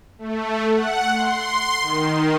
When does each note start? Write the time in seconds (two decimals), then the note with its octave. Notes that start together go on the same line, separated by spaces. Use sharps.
0.18 A3
0.72 F#5
1.13 C6
1.80 D#3